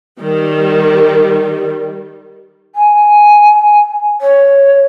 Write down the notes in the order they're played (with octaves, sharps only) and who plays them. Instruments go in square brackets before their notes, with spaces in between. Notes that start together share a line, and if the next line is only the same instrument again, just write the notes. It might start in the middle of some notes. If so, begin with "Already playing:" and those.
[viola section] D#3 G3
[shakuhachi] G#5
C#5